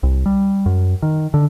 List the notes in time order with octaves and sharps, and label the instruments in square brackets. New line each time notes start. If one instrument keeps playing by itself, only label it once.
[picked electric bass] C2
G3
F#2
D#3
D3